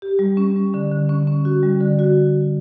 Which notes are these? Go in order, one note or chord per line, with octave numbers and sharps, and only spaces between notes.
G4
G3
C#4
G3
D3
D3
C#4
C#4
F#4
G3
D3
F#4